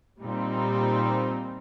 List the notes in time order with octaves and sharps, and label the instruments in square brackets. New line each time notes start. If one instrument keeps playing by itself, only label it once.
[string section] A#2 G3 C4 D#4